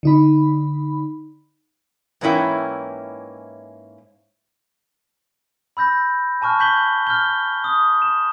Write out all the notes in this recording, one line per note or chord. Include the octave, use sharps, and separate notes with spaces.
D3 D#4 B5
G#2 E3 A#3 C#4 E4 G5
B5 E6 G6 A#6
G#5 A5 C#6 F6 F#6
C#6 F6 G6 B6 F#7 G7
F6 G6 G7
D#6
E7